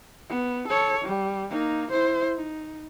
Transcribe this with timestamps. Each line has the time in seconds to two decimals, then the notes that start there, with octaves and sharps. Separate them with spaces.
0.29 B3
0.68 A4 C#5
1.05 G3
1.50 A#3 D#4
1.91 E4 C5
2.36 D#4